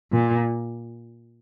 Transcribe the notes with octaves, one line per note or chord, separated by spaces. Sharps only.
A#2